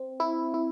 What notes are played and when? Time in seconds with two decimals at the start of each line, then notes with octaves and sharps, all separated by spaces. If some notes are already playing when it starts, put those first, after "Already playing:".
Already playing: C4
0.20 E4
0.54 E4